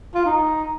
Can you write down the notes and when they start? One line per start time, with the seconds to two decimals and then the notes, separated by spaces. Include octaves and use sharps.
0.15 F4
0.26 D#4